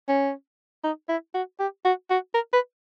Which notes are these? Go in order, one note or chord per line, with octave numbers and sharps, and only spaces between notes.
C#4
D#4
E4
F#4
G4
F#4
F#4
A#4
B4